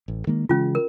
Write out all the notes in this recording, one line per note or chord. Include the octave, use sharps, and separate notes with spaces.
A1
D#3 G#3 A#3
C#3 E3 G#3 C#4 F4
A#4